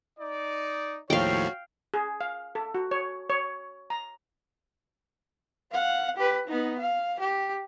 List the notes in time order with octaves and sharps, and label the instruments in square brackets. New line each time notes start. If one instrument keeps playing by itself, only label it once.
[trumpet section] D#4 D5
[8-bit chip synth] D#2 A2 F3 [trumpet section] F#4 C#5 [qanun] F5 G5
[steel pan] G#4
F5
A4
F#4
C#5
C#5
A#5
[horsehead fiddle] F5 F#5
G4 B4
B3 D#4
F5
G4